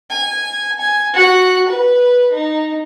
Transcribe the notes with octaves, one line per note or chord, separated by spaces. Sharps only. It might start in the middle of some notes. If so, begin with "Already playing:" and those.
G#5
G#5
F#4 F#6
B4
D#4